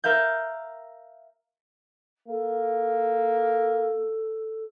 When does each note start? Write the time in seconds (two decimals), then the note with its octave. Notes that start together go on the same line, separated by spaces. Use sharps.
0.04 A#4 E5 F5 G6
2.28 A#3 A4